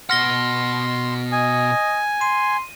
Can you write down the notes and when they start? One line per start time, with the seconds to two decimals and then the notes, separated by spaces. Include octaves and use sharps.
0.10 B2 F#5 C6 F6 A#6 G7
1.32 D#5 G#5
2.21 C6 D#7